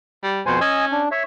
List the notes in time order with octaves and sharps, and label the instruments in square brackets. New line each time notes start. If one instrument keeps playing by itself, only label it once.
[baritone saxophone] G3
[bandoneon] F2 C5 G#5 [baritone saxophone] B2
[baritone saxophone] C#4 [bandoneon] D#5 G#5 E6
[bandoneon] D4
C#5 E5